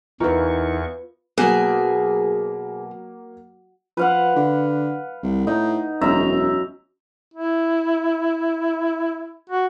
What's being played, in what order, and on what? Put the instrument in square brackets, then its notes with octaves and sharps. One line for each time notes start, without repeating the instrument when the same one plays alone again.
[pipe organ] E2 C#6 [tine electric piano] E3 D#4 A#4 [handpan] F4 B4
[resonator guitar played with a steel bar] B2 [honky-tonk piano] F#3 A#3 [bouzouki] G#4
[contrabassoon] F3 [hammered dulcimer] B4 F5 F#5
[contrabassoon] D3
C2
[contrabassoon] A2 [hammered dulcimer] D#4
[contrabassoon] E1 [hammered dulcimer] F#2 E5 A#5
[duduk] E4
F#4